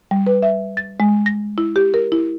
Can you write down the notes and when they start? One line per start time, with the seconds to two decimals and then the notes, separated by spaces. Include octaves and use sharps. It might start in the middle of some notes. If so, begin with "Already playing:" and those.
0.11 G3
0.27 B4
0.43 E5
0.77 A6
1.00 G#3
1.26 A#6
1.58 E4
1.76 G4
1.94 A#4
2.12 E4